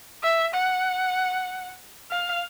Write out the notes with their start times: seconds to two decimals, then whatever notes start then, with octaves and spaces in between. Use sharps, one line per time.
0.23 E5
0.54 F#5
2.11 F5